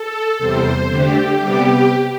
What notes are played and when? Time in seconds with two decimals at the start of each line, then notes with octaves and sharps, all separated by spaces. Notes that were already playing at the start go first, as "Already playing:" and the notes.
Already playing: A4
0.39 E2 C3 G3 C5
0.89 D3 A3 D4 G4
1.39 C3 G3 B3 G4